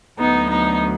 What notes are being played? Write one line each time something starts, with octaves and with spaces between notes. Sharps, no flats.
D2 D3 F#3 B3 D#4
B3 D#4